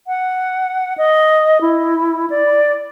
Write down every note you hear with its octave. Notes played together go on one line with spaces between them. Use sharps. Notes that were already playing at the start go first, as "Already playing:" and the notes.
F#5
D#5
E4
D5